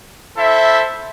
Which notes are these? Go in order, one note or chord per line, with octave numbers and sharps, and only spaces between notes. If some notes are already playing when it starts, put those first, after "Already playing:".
E4 A4 C5 E5